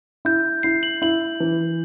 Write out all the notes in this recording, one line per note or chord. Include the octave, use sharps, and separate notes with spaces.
E4 G6
E4 C7
F#7
E4 F#7
E3